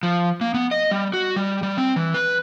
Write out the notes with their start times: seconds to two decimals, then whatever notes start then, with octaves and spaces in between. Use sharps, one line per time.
0.03 F3
0.41 A#3
0.54 B3
0.71 D#5
0.91 G3
1.13 F#4
1.36 G3
1.63 G3
1.77 C4
1.96 E3
2.14 B4